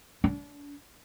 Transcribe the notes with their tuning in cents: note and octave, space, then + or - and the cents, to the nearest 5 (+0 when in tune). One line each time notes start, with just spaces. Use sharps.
D4 -40